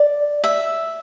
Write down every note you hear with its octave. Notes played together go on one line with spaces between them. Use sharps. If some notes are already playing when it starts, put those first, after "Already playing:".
Already playing: D5
E5